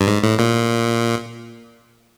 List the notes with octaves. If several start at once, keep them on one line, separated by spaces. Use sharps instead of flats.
G2
G#2
A2
A#2